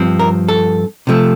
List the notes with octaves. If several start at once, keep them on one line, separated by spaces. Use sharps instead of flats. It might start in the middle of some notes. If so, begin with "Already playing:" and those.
Already playing: G2 F3 C4
A#4
A4
C3 F3 A3